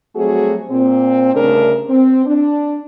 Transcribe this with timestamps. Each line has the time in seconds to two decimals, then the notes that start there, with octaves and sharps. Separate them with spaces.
0.16 F#3 G3 A3 C4 F#4 G#4
0.70 A#2 C4
1.33 D2 G2 C#3 A3 D4 A#4
1.89 C4
2.26 D4